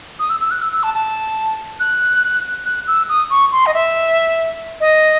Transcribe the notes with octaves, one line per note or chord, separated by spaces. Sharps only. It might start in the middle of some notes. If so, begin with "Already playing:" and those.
D#6
E6
E6
F#6
E6
E6
A5
A5
F#6
F#6
E6
D#6
C#6
C6
D#5
E5
D#5